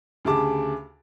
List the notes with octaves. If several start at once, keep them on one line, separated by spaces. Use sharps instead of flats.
D2 C#3 G4 G#4 A5 D6